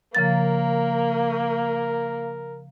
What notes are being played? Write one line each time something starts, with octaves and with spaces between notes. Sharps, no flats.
C#3 F3 A#3 A#4 A6